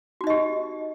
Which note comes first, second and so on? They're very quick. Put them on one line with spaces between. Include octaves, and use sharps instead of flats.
F#4 D#4 D#5 G4